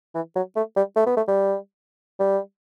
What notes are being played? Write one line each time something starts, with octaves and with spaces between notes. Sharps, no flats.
E3
F#3
A3
G3
A3
B3
A3
G3
G3